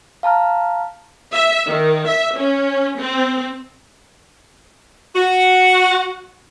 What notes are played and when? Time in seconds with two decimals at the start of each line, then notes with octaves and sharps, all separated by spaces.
0.23 F5 A5 A#5 F6
1.33 E5
1.68 D#3
2.09 E5
2.39 C#4
3.00 C4
5.16 F#4